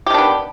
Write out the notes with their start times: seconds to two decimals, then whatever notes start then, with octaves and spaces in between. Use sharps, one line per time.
0.06 G4
0.10 D#3
0.14 D4
0.18 B3